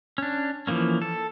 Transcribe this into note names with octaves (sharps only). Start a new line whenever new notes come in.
C#4 D4
E3 F3 A#3 C#4
A4